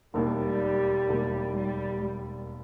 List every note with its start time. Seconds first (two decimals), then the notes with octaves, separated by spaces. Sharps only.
0.14 E1 D#2 D#3 G3 A#3
1.09 E1 D#2 D#3
1.57 G3